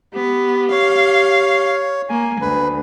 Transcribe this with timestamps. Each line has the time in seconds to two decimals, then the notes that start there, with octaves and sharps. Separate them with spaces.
0.14 B3 G4
0.71 C#5 F5
2.09 A#3 G#5
2.41 D2 B4